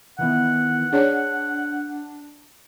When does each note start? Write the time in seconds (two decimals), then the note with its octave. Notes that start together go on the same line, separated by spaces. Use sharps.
0.19 D#3 E3 B3 F#5
0.92 D4 G#4 C#5 D5